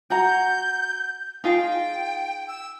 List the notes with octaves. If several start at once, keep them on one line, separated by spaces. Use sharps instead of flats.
F#4 F#5 A#5 G6
D#4 F4 G#4 G5
E6